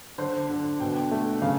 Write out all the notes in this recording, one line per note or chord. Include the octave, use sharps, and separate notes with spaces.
D3 C5
D3
B2 G5
A3
C#3 F5